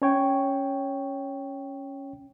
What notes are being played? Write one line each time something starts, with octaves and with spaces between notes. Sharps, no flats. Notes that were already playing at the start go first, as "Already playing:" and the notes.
C#4 C#5 G5